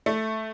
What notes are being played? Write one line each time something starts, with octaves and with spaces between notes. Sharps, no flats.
A3